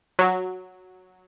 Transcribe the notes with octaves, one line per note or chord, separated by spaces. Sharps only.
F#3